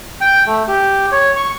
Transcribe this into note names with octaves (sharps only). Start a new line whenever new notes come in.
G5
A3
G4
C#5
C#6